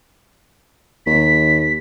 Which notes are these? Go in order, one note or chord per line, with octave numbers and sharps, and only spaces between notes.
D#2 B6